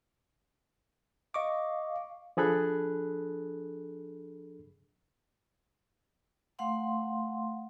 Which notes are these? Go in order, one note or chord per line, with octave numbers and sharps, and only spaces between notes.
D#5 F5 C#6 D6
F3 D4 G#4 A4 B5 F#6
A3 F5 F#5 C6